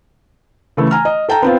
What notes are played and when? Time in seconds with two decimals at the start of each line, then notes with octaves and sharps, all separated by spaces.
0.77 C#3 E3 A3
0.91 G#5 A#5 F6
1.05 D#5
1.29 A4 G5 A5 A#5
1.42 B3 C4 F4